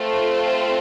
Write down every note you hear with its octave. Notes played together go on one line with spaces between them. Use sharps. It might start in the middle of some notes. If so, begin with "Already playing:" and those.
Already playing: A3 C4 F4 A4